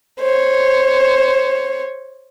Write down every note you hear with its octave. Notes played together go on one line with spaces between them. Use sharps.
C5 C#5